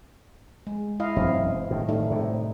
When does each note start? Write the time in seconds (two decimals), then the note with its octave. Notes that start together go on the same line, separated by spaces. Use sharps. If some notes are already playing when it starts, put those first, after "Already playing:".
0.67 G#3
1.00 E4 D#5 F5
1.16 E1 F#2 E3 C4
1.71 A2 D#3
1.89 G3 A3 D#4
2.10 A2 C3